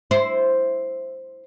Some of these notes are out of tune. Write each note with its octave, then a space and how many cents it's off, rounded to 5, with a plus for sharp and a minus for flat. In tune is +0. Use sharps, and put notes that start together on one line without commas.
E4 +0 C5 +0